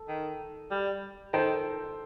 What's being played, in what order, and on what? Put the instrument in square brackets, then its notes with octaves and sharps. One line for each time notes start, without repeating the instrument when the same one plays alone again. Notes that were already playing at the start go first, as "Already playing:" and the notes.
Already playing: [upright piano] A4
[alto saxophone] D#3
G3
[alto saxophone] D#3 [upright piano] A4 C5